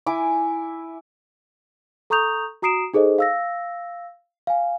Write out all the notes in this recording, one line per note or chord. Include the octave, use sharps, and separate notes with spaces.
E4 G#5 D6
A4 A#5 C#6 D#6 G6 F7
F#4 A#5 D#6 C7 D7 E7
D#4 G#4 A4 C5 D#5
F5 E6 A#6
F5 G#5